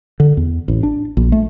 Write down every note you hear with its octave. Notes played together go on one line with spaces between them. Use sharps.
D3
E2
A1
D4
A#1
A3